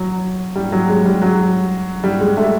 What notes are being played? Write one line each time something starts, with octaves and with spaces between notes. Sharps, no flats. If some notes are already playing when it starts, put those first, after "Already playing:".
Already playing: F#3
G3
F#3
G#3
G3
F#3
G3
G#3
A3